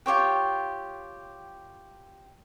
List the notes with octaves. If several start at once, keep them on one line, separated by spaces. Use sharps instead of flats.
F4 G4 C#5 G5